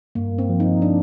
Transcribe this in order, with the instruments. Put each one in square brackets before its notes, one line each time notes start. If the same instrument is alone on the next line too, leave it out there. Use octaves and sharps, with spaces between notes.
[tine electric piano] G2 [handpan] A#3
[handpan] C4
[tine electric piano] F3
[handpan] D#4
D4